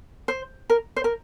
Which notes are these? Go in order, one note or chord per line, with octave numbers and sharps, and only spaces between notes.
C5
A#4
C5
A#4